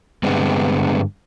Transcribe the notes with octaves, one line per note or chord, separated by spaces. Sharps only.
G2 D3 G#3 B3 C4